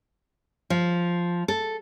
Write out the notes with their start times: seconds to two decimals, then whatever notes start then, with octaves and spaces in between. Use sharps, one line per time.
0.70 F3
1.48 A4